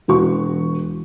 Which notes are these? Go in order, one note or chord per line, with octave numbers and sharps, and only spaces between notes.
E1 F#4 C#6